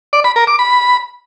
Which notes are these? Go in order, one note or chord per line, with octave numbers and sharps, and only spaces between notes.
D5
B5
A#4
D6
B5